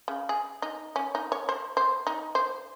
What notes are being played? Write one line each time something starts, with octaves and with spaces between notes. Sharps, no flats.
C#3
G#4
D#4
C#4
D#4
C#5
C5
C5
D#4
C5